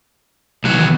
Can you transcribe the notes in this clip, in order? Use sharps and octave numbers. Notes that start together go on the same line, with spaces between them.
C2 D#3 E3 F#3 B3